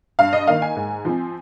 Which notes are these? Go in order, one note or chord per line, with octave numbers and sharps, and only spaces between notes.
G2 F5
D#5
D#3 A#3 F5
G#5
G#2
F3 C4